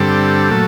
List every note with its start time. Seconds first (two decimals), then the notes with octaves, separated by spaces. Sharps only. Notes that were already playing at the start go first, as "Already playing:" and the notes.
Already playing: G2 D3 G3 C4 A4
0.51 A#2 F#3 A3